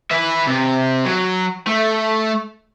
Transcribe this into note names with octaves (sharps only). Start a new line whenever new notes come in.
B4 E5
C3
F#3
A3